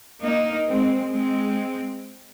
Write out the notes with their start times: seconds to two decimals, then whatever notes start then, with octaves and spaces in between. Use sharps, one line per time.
0.24 A#3 D#4
0.69 G#3 C4
1.15 G#3 C4